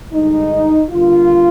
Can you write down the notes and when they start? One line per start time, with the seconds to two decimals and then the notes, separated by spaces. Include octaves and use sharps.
0.13 G2 D3 G#3 D#4
0.90 D3 G3 A#3 F4